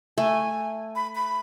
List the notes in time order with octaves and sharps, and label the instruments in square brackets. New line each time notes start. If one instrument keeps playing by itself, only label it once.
[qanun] A3 [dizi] G#5
[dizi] B5
B5